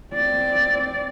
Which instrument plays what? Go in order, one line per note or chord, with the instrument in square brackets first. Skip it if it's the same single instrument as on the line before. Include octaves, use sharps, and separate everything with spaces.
[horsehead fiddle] C4 D5